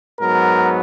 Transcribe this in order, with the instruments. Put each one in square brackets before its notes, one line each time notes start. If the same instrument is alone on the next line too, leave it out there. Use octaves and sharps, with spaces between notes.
[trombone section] G#2 F#3 B3 A#4